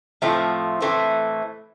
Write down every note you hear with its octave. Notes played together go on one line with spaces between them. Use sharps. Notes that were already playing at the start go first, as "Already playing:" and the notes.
A2 F3 A3 C4
A2 E3 A3 C4